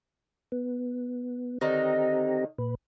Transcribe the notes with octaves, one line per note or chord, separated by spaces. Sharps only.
B3
D3 D#3 C4 D#4 G4 A#5
A#2 B4